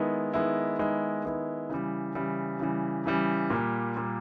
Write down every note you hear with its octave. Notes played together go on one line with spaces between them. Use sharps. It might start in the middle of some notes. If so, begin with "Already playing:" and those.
Already playing: D#3 G#3 B3 E4
D#3 G#3 B3 E4
D#3 G#3 B3 E4
D#3 G#3 B3 E4
C#3 E3 G3
C#3 E3 G3
C#3 E3 G3
C#3 E3 G3
A#2 G3 A#3
A#2 G3 A#3